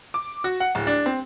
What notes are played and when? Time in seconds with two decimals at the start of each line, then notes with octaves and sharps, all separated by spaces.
0.14 D6
0.44 F#4
0.60 F#5
0.75 D1
0.87 D4
1.06 C4